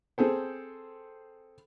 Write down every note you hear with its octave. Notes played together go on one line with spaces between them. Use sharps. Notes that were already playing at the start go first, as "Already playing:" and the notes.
C4 G#4 A4 C5